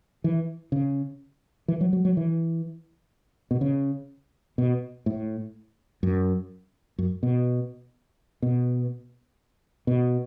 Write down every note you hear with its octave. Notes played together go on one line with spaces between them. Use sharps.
E3
C#3
E3
F#3
F#3
F#3
E3
B2
C#3
B2
A2
F#2
F#2
B2
B2
B2